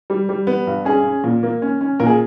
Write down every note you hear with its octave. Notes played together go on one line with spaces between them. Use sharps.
G3
G3
B3
G2
C#4 G#4
C#4
A#2
A#3
C#4
C#4
A#2 A#4
G#4